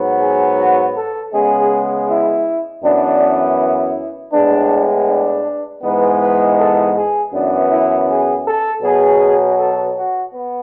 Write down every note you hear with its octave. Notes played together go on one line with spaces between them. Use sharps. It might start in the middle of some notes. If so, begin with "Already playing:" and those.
Already playing: G#2 F#3 B3
G#4
F#4
A4
C#3 G#3 B3 G#4
E4
F#2 E3 B3 D4
E4
A2 G#3 B3 D4
D4
G#2 E3 G#3 B3 B4
B4
A4
G#4
F#2 E3 B3 D4
E4
G#4
A4
B2 F#3 B3 G#4
A4
F#4
B3